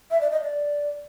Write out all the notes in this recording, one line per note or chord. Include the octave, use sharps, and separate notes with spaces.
E5
D5
D#5
D5